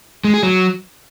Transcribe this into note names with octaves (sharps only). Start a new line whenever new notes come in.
G#3
G#4
F#3